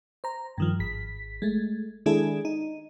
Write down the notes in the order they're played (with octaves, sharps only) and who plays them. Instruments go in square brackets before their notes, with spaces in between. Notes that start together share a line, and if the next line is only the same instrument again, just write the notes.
[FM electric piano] C5 A#5
G2 D#3 F3
G#1 B6
G#3 A3
D#3 G#3 D4 E4 G#4 A4
D#4